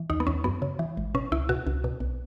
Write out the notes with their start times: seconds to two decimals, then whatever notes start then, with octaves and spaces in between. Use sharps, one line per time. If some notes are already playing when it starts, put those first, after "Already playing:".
Already playing: E3
0.10 D#2 D#4
0.20 B3
0.27 D#2 C#4
0.44 F#2 B3
0.62 C#3
0.79 E3
0.97 G#1
1.15 B2 C#4
1.32 C#2 E4
1.49 B2 F#4
1.67 C#2
1.84 B2
2.00 B1